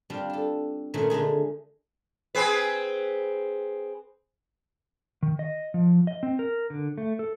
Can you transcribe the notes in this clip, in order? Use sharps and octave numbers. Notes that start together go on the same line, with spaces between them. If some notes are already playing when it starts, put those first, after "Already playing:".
G3 C4 D4 F4
D4 A4
A#2 D#3 F#3 A3 C#4
D3 G#3 A3 G#4
C4 G#4 B4
D#3
D#5
F3
D#5
C4
A#4
D3
A3
A4